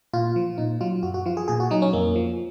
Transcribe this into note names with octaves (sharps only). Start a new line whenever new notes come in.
A#2 F4
F3
A#2 D#4
F#3 F4
F#2 F#4
F#4
F3 F4
G#4
A#2 G#4
F#4
F#3 D#4
C#4
F2 A#3
F3